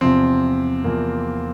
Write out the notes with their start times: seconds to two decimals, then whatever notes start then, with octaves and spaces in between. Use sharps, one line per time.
0.01 E2 C3 F3 C4
0.84 E2 C3 F3 A#3